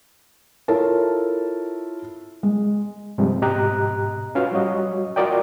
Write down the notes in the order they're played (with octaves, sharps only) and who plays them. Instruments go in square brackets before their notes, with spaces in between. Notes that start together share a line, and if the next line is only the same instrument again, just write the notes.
[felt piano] E4 F4 A4 A#4 C#5 A5
G#3
[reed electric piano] G2 C3 F3 G3 G#3
G#2 B2 G4 D#5 A#5 F#6
C#4 F4 F#4 B4 F5
F#3 G3 F#4 C#5 D#5
F4 F#4 A#4 D5 D#5 G5